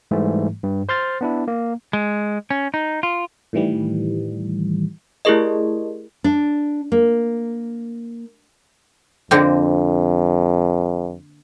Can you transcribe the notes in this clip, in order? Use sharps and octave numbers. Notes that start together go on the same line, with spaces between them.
G#2 E3 G3 A3
G2
C5 C6 F6 A6
B3 D4 E4
A#3
G#3
C#4
D#4
F4
A2 D#3 E3 G3
A3 E4 G4 G#4 A#4 D#5
D4
A#3
F2 D3 A#3 C4